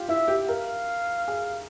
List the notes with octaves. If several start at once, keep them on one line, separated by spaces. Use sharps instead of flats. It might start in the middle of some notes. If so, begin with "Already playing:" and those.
Already playing: F4 G4
E4 E5
G4
A#4 F5
G#4